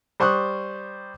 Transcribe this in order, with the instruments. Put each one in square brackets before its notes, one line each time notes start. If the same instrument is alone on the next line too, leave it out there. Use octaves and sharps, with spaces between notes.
[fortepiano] G3 C5 C#6 D#6 F#6